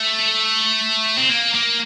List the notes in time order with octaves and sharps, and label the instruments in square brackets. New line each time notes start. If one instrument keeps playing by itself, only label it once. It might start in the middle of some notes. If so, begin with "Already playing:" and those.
Already playing: [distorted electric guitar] A3
C4
A#3
A#3